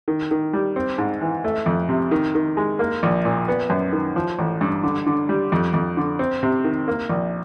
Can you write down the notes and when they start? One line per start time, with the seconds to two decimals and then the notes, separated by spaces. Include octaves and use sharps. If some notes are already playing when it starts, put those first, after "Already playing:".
0.08 D#3
0.31 D#3
0.53 G3
0.76 C4
0.98 G#2
1.21 E3
1.44 A3
1.66 F2
1.89 C3
2.11 D#3
2.35 D#3
2.57 G#3
2.79 A#3
3.03 A#1
3.25 A#2
3.48 B3
3.70 F#2
3.93 D#3
4.16 F3
4.39 A1
4.61 G2
4.84 D3
5.06 D3
5.29 G3
5.52 F2
5.74 F2
5.97 D3
6.19 C4
6.43 C3
6.64 D#3
6.88 A#3
7.09 A#1